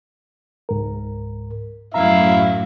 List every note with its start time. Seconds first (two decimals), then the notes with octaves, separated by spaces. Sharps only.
0.69 C#2 G#2 A#4
1.94 F#2 A2 E4 E5 F5 A#5